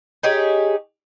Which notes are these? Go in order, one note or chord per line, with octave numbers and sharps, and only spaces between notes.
D#4 G4 G#4 C#5